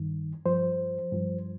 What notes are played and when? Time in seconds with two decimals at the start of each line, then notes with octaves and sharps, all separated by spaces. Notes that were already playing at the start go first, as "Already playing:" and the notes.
Already playing: G2 D#3
0.45 G2 F3 C5
1.12 G2 F3